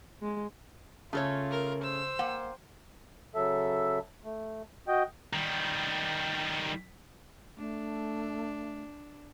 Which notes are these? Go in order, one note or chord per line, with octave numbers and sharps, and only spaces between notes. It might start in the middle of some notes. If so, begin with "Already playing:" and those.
G#3
C#3 A3 F4 A4 C#5
A#4
C5 E6
A#3 F#5 G5
C#3 F#3 A4 E5
A3
F#4 D#5 G5
D#3 G3
A3 D4